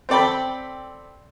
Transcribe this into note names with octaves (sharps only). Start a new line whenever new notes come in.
C4 A4 D5 G5 B5